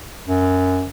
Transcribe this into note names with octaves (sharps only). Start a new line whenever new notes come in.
F#2